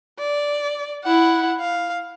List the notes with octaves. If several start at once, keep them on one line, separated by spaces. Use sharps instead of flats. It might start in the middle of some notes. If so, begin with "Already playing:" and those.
D5
E4 F#5
F5